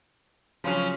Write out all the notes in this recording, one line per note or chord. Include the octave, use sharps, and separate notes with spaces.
C#3 F3 F#3 C#4